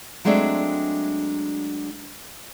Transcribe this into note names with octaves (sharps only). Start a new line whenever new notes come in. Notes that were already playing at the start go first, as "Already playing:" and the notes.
F#3 G#3 A3 C4 D4 E5